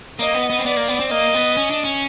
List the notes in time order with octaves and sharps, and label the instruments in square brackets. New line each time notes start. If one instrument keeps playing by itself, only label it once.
[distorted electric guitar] A#3 [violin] D#5
[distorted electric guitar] B3
B3
C4
[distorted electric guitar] B3 [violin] D5
[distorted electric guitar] A#3
B3
C4
[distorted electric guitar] A#3 [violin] D#5
[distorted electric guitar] B3
C#4
D4
C#4